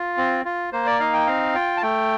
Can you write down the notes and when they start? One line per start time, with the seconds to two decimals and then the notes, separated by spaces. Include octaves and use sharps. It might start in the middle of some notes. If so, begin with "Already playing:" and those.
Already playing: F4
0.18 C4
0.45 F4
0.73 A#3 C5
0.86 D5
1.00 D#4 F5
1.14 G5
1.27 C4 F5
1.55 F4 G5
1.77 A5
1.82 A3 G5